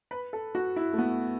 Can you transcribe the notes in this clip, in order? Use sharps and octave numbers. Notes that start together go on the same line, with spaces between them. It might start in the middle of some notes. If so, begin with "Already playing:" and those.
B4
A4
F#4
E4
A3
B3